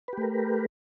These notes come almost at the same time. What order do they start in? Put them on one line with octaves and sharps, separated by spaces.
B4 G4 A3 A#4